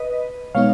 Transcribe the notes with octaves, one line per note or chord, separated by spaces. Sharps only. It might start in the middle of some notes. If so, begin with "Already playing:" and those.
Already playing: B4 D#5
B2 G#3 B3 D#4 C#5 F5